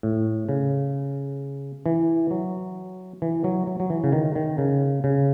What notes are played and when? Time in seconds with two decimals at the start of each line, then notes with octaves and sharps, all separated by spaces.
0.03 A2
0.49 C#3
1.86 E3
2.31 F#3
3.22 E3
3.44 F#3
3.67 F#3
3.80 F#3
3.90 E3
4.04 C#3
4.13 D#3
4.36 D#3
4.58 C#3
5.04 C#3